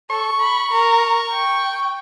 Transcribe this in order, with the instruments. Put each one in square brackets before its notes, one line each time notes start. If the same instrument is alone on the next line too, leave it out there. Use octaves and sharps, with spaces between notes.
[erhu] A4 [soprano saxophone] C#6
[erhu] B5
A#4
G5